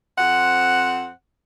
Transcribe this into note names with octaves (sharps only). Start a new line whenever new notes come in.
F2 C4 F#5